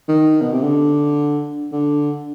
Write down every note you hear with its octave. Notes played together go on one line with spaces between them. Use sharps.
D#3
B2
C3
D3
D3